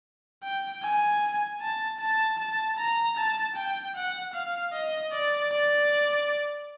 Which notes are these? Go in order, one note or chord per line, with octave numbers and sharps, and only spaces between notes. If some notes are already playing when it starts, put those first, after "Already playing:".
G5
G#5
A5
A5
A5
A#5
A5
G5
F#5
F5
D#5
D5
D5